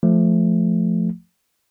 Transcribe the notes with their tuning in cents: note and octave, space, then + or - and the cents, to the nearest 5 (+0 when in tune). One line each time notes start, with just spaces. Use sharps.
F3 +0 A3 +0